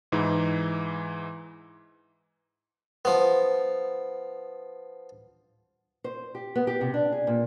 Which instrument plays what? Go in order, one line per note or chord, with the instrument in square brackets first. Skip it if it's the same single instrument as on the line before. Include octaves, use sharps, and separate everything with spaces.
[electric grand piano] G#2 E3 D#4 E4
[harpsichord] F3 B3
[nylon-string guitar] C5
G4
B3
G4
C3
D4
G#4
A#2